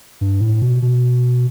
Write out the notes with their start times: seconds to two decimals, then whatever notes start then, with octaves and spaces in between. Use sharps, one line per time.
0.21 G2
0.40 A2
0.62 B2
0.82 B2